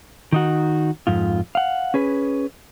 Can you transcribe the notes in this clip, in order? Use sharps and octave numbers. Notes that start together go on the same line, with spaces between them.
D#3 D#4 F#4
F2 G#2 F4
F5 F#5
C#4 G#4 B4